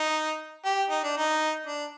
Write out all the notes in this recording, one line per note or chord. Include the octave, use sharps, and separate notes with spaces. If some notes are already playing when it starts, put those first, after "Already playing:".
Already playing: D#4
G4
D#4
D4
D#4
D4